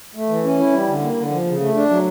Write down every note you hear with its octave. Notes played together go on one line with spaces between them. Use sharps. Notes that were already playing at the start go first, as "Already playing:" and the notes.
A3
E3
C#4
E4
G3
D3
A#3
D3
F3
C#3
A3
D4
F#3